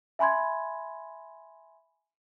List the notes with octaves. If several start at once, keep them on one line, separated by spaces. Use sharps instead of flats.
E5 G#5 B5 C6 G#6